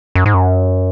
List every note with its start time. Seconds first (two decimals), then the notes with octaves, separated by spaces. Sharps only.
0.15 F#2
0.26 G#2
0.34 F#2